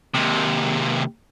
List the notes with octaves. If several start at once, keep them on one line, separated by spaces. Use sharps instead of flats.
D#2 C3